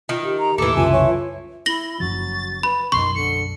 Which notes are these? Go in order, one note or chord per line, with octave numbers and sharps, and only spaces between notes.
D#3 F4
G4
A#5
D#2 A2 E3 A4 D6
C2 F#2 C#3 F4 G#5
C#5
E4 A#6 F#7 G7
F#1 F#2 F3 F#3 A6
B4 B5
B1 F#2 D#3 C6 C#6
D3 C#7